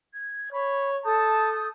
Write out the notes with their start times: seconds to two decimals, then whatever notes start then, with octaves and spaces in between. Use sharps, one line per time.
0.13 G#6
0.52 C#5 B5
1.05 A4 A5 D#6 G6